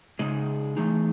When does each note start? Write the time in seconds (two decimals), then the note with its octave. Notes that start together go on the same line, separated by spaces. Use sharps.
0.19 C#3 G#3 D#4 G#4
0.77 E3 A3 D#4 G#4